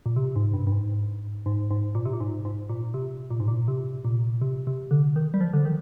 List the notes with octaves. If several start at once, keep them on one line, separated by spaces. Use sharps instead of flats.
A#2
C3
G#2
G2
G2
G#2
G#2
G#2
A#2
C3
A#2
G#2
G#2
A#2
C3
A#2
G#2
A#2
C3
A#2
C3
C3
D3
D#3
G3
F3
D3
D#3